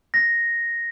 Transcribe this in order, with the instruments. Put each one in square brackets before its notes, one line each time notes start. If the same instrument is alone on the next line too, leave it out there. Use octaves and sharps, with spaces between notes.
[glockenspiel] A#6